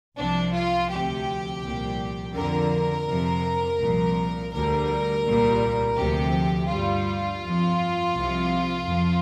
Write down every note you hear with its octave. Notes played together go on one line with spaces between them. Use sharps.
C2 C3 F3 D4
F4
D2 C3 F3 G4
C2 A#2 F3
F2 D3 F3 A#4
F2 C3 F3
C2 A#2 F3
D2 D3 G3 A#4
C2 A#2 G3
D2 C3 F3 G4
G2 G3 F4
F2 F3
C2 C3 F3
F2 F3